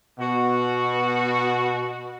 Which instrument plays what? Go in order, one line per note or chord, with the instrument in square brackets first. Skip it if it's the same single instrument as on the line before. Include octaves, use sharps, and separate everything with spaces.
[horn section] B2 F#4